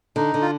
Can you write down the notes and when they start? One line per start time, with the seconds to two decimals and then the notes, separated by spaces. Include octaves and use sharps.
0.16 D3 D#4
0.34 D3
0.42 F4